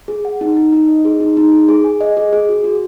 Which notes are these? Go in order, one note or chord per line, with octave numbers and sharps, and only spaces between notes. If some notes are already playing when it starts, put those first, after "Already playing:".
G#4
F#5
D#4
D#4
D#4
D#5
G#4
D#4
D#4
G#4
G#4
G#5
D#5
G#4
G#4
F#4
F#4